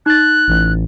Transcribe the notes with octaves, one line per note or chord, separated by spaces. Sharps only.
D#4 F#6 A6
A1